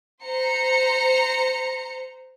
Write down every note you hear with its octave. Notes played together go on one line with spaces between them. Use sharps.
C5 A#5 C#7